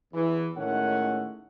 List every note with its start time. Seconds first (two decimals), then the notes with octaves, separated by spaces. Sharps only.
0.13 E2 E3
0.57 A2 D#3 G#3 A3 C#4 F#5